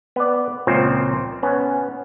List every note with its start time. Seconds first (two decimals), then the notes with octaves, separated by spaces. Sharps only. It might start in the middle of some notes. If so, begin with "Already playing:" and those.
0.16 B3 D5
0.67 C#2 A#2 F3 C4 C5 C#5
1.43 B3 C#4